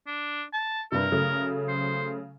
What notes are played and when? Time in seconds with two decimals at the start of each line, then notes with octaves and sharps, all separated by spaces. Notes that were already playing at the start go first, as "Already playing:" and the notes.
0.07 D4
0.53 A5
0.92 G2 C3 A#4
1.12 C#3 F#3 A3
1.69 C5